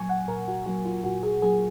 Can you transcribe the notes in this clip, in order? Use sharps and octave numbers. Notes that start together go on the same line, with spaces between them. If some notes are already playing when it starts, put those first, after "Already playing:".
Already playing: A#2 F#3 A#3 G#5 C#6
F#5
A#2 A#4
F#4
F#3 A#3 F#4
F4
A#2 F#4
G#4
F#3 A#3 G#4